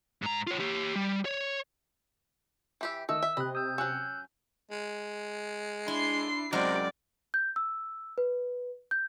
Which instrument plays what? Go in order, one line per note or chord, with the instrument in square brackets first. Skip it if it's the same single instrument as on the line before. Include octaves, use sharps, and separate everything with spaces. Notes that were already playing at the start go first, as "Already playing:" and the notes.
[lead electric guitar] G#2 A#5
F4 C#5
G4 C#5
G3
C#5
[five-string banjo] E3 G4 E5
[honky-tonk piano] D#3 [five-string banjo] A3 [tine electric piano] D#5 [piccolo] E6
[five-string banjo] E5
[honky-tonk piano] C3 [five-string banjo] D#5 [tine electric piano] B5 F#6
[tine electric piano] D#6 E6 [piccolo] G6
[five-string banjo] F#3 C#4 [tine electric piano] E6 F#6
[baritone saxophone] G#3
[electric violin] D4 C7 [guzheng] E4 [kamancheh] C6
[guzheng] F#2 G#3 A#4 [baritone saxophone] C3 [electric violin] F#4 G5 [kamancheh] D5
[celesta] G6
E6
B4
G6